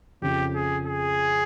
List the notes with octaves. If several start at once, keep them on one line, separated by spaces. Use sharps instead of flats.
F2 C#3 F3 G4
G#4
G#4